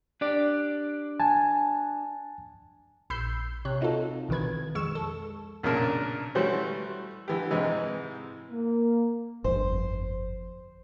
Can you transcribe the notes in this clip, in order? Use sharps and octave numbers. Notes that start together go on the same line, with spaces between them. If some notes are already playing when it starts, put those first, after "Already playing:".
D4 G4 D5
G#5 A5
A#1 B5 E6 G6 C7
C3 C#5 F#6
C4 D#4 F4 F#4 A4
B1 D#3 E3 B4 G#6
F2 G#3 C#6 E6 E7
A4
B1 A#2 C#3 D4 A#4 A5
E3 G3 A3 C#4 F#4 C5
D3 E3 G4
G#2 C3 E3 G#3
A#3
G1 F2 C5